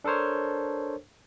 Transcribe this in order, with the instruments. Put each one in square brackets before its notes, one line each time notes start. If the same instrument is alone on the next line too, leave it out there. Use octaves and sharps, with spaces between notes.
[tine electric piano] D4 A4 A#4 C5 C#5